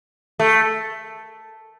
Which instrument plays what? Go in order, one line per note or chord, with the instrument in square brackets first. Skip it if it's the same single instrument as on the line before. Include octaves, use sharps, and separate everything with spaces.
[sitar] A3